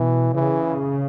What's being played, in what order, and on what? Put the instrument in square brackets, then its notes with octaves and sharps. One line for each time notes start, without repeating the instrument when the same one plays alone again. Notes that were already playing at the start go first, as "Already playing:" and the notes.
Already playing: [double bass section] B2 [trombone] E3
[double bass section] C#3 [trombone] E3